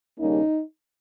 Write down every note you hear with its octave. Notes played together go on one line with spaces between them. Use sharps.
D#2 C#3 G3 A#3 C#4 D#4